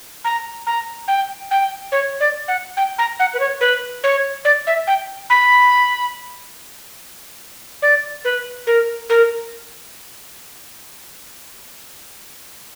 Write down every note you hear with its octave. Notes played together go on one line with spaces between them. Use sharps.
A#5
A#5
G5
G5
C#5
D5
F#5
G5
A#5
F#5
B4
C#5
B4
C#5
D5
E5
G5
B5
D5
B4
A#4
A#4